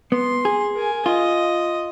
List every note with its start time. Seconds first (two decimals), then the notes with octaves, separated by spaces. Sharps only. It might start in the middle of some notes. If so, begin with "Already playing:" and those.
0.12 B3 C6
0.45 G#4
0.75 A#4 G#5
1.06 F4 D#5